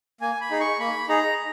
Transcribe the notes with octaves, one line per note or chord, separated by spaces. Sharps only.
A#3 G#5
B5
D#4 G#4
C#6
A#3 B5
D#4 G#4 A#5